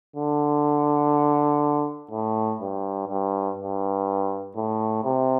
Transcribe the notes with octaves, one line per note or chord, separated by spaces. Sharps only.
D3
A2
G2
G2
G2
A2
C3